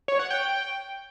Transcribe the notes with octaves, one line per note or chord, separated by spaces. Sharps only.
C#5
F#5
G5